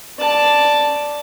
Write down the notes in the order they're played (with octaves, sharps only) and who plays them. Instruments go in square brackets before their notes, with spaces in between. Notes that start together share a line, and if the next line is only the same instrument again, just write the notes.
[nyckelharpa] D5 A5